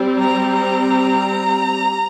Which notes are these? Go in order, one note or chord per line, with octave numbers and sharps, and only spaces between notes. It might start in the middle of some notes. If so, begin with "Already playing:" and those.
Already playing: G3 C4
A#5
A#5